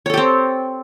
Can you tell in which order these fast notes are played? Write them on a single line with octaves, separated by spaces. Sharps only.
C#5 A4 G4 C4